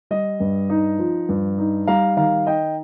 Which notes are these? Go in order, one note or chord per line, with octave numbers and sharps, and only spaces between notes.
G3 D#5
G2
D#4
F3
G2
D#4
G3 F5 A#5
D#3 F5 A#5
D#4 D#5 G5